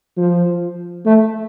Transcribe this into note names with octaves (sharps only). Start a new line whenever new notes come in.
F3
A3